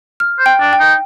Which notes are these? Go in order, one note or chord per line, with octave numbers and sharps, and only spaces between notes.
F6
C5
G5
D4
G5
D#4